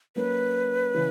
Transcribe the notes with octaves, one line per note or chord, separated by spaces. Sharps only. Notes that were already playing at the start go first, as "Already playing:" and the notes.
F#3 A#3 C#4 B4
C#3 E3